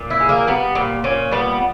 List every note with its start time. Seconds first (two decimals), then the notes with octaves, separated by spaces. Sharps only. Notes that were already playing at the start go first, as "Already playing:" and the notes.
Already playing: A#2
0.10 E4
0.20 G#3
0.29 A#3
0.47 G3 B3
0.75 A#2
1.04 A#2 C#4
1.31 G3 B3